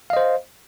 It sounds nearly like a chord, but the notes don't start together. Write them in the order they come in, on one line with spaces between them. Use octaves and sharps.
F5 D#5 C5